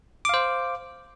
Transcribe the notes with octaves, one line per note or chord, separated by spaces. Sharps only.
C5 F5 D6